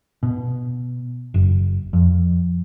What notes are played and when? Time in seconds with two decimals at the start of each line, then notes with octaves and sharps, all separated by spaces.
0.23 B2
1.34 F#1
1.93 F2